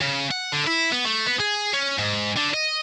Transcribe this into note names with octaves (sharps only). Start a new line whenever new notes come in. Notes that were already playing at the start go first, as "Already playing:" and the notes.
C#3
F#5
D3
E4
B3
A3
B3
G#4
C#4
G#2
D3
D#5